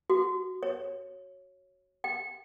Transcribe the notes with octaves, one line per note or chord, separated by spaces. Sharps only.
F#4
C#5
G5